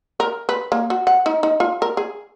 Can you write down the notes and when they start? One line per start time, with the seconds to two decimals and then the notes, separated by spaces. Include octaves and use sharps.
0.20 A#4
0.49 B4
0.72 A#3
0.90 F#4
1.07 F#5
1.26 D#4
1.43 D#4
1.60 F4
1.82 A#4
1.97 G#4